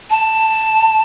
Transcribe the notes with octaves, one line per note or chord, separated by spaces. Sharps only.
A5